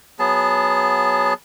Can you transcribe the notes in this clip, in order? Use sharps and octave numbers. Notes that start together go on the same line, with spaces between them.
F#3 B3 G#4 A5